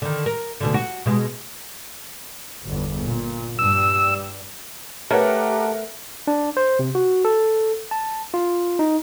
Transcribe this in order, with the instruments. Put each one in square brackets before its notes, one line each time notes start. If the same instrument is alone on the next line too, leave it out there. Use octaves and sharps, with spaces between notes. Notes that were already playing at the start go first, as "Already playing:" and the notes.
[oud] D3 D#3
A#4
D2 B2 D3
F#4
B2 G#3
[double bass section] G1 E2
A#2
[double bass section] G2 G3 [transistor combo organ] E6
[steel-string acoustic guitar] A3 [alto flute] G4 [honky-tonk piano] A#4 F#5 [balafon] B4 C#5 E5
[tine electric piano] D4
C5
C3
F#4
A4
A5
F4
D#4